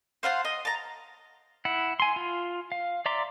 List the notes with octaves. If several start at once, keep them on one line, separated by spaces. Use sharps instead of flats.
C5 F5 F#5 A5
D#5
A5 A#5
E4 F#5
G#5 C6
F4
F5
D5 E5 A#5 C6 D6